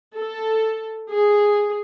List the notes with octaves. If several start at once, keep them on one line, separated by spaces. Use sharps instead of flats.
A4
G#4